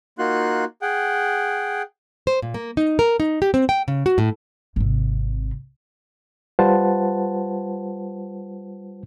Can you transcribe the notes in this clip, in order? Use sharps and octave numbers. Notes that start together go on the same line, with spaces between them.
A#3 D#4 F4 F#4 C6 F#6
G#4 F#5 G5
C5
A#2
A#3
D#4
A#4
D#4
G4
C4
G5
C#3
F#4
A2
G#1 C3
G3 F4 B4 C5 F#5 A5